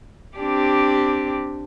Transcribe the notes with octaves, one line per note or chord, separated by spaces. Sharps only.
C4 D4 G4